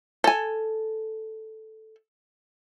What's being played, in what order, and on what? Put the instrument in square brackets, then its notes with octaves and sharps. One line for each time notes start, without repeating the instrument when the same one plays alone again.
[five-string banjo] A4 G#5